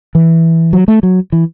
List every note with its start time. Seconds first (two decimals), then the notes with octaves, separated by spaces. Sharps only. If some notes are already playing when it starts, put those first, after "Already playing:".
0.15 E3
0.73 F#3
0.88 A3
1.03 F#3
1.32 E3